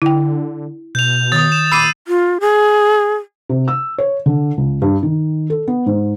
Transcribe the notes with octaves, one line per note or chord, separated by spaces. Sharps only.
D3 E4 G5
B2 G6 F7
D#3 D#6 A6
E7
A#2 B5 D6 E6 C7 D#7
F4
G#4
C3
E6
C#5
D3
C#2
G2
D#3
A4
B3
G#2